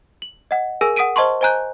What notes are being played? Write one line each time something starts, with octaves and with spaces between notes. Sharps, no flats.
F#7
D#5 F#5
G#4 A#4 G#5 E6 A#6
F#5 D#6 B6 D7 D#7
C5 D#5 A5 C6 C#6
C5 D#5 G#5 A#5 F#6 G6